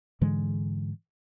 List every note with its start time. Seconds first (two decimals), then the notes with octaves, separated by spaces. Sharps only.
0.21 G#2 D3 E3 G#3